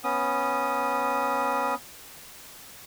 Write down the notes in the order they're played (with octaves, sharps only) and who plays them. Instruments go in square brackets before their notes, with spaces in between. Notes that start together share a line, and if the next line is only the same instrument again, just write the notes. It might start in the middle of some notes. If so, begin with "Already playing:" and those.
[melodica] B3 C#4 D#6